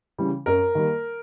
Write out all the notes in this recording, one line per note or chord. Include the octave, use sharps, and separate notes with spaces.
C#3 E3 G3
F#2 A#4
D#3 G3 A#3